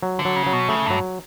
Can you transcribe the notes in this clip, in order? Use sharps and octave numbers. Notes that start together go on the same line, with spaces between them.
F#3
D3
F#3
C#3
F#3
B2
C#3 A3
G2 F#3